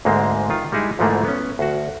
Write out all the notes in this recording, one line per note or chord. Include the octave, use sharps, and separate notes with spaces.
D2 G#2 G#3 A#3 C4
D#3 F4
G3 G#3 D#4 E4 G#4
D2 G#2 E3 F3 A3 A#3
B3 C#4
D2 F#4